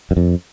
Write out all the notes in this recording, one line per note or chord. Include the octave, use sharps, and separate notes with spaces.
F#2
F2